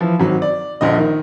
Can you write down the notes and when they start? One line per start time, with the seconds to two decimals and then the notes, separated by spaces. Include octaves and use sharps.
0.01 E3 F3
0.20 G#1 F#3
0.42 D5
0.81 A#1 A#2 D3 D#5
0.98 D#3